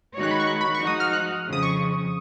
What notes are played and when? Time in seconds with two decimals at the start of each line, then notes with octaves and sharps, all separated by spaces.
0.14 D#3 G#3 D#4 F#4 C#5
0.23 F#6
0.31 B5
0.40 C#6
0.47 F#6
0.61 B5
0.75 C#6
0.80 F3 G#3 D#4 F#4
0.87 D#6
1.00 F6
1.13 F#6
1.46 F2 C#3 F3
1.53 D#6
1.63 C#6